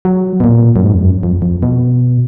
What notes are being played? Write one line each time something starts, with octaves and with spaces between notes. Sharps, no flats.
F#3
B2
A#2
F#2
G#2
F2
F#2
F2
F2
B2